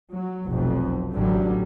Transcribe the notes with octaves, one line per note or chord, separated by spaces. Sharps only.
F#3
F1 B1 F2
A1 D3 F#3 G3